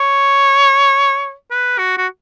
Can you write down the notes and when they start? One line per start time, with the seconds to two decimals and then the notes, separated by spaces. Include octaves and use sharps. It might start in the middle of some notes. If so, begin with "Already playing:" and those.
Already playing: C#5
1.51 B4
1.78 F#4
1.97 F#4